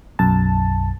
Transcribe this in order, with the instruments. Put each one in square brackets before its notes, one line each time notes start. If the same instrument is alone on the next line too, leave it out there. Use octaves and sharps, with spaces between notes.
[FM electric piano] B1 F#2 A5